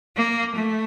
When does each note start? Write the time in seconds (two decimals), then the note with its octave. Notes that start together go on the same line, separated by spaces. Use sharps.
0.17 A#3
0.55 A3